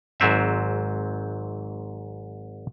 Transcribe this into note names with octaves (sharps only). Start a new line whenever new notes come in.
G#1 G#2 F#3 C4 E5